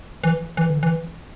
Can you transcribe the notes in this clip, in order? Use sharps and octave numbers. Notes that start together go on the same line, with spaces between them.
E3
E3
D3
E3